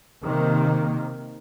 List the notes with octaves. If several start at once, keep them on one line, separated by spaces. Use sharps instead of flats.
C3 D#3 A#3